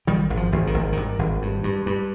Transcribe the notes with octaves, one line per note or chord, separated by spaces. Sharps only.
G#1 D#3 G3
G#1
F3
G#1
D#3
G#1
G2 D#3
G#1
G2
G2
G2